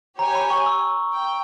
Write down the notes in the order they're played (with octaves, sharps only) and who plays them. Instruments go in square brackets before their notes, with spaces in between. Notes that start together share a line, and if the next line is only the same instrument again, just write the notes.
[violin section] G4 C#5 G#5 [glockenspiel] A#5
[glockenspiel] B5
C#6
E6
[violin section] G5